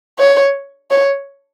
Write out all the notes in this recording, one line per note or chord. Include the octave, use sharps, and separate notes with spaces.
C#5
C#5